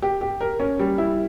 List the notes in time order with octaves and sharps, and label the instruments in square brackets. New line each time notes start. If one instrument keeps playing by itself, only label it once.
[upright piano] G4
G4
A#4
C#4
G3
E4